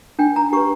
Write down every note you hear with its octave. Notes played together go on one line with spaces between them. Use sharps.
D4 G5
A#5
G4 B4 C#6